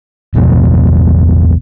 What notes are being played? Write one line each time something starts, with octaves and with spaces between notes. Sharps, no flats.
A1 E2 B2 F3